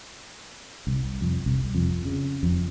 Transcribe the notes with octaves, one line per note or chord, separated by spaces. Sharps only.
C2
F2
C2
F2
C#3
F2